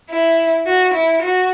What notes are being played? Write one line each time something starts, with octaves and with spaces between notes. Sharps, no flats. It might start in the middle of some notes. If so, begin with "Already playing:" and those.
E4
F#4
E4
F#4